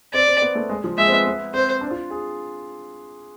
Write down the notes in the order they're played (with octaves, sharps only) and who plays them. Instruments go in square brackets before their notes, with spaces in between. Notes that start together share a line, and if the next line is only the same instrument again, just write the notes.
[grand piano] C4 [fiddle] D5
[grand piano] C4
B3
A3
G#3
F3
[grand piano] G#3 [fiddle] E5
[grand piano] C4
B3
B3
[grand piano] C4 [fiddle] C5
[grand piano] D4
F4
G#4